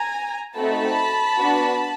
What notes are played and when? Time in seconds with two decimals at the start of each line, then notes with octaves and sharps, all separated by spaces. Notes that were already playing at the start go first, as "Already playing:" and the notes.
Already playing: G#5 A#5
0.58 A3 C4 D#4 F#4 A4 A5 B5
1.38 B3 D4 F#4